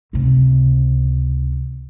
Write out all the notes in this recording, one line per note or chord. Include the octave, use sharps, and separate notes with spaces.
C#2 C3